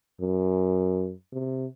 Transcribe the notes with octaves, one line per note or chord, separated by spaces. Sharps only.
F#2
C3